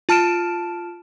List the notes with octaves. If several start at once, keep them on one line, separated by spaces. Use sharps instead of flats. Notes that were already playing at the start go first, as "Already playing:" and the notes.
F4 A5 F6 D7 E7